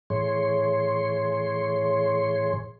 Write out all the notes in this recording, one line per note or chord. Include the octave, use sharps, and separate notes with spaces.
A2 E3 G#4 C#5 C6